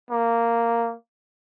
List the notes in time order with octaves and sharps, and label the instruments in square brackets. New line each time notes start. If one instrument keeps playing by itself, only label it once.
[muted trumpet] A#3